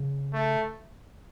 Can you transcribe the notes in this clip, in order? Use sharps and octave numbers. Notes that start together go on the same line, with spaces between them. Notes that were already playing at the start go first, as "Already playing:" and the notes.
Already playing: C#3
A3